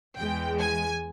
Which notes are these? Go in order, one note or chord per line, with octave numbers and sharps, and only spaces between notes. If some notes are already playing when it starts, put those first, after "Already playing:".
E2 E3 G#3 G5
G#5